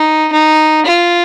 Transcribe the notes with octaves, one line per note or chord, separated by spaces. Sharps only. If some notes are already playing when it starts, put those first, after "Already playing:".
Already playing: D#4
D#4
F4